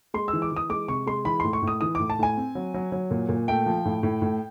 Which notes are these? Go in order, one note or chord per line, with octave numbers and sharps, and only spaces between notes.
G#3 C6
E6
E3
D6
E3 D#6
G#3 D6
C3 C#6
G#3 C6
E3 B5
A2 C6
C#6
A2
D#6
E3 D#6
A2 D6
A5
A2 G#5
C4
F#3
F#3
F#3
A#2
A#2
A3 G5
F3
A2
A2
A2